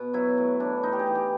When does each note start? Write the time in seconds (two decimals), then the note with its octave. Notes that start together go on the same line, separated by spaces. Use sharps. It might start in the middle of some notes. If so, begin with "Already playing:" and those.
Already playing: B2
0.13 F#3 E4
0.38 A2
0.60 E3 D4
0.83 A2 D#4
0.93 G4
0.99 G#4
1.07 E3
1.15 G4